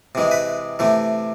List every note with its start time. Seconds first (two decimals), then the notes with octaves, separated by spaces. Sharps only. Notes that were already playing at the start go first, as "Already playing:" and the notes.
0.15 C3 E3 G#3
0.31 B4
0.79 C3 E3 A3